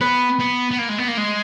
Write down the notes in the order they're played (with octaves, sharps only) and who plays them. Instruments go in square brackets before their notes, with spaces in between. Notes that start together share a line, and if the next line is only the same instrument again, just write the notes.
[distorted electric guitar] B3 [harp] B4
[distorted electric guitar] B3
B3
A#3
G#3
B3
A#3
G#3